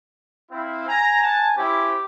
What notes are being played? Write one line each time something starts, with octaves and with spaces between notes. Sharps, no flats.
C4 E4 F5
G#5 A#5
F#5 A5
C#4 E4 G4 C5